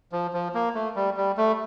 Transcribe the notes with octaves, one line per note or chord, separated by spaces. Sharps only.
F3
F3
A#3
A3
G3
G3
A3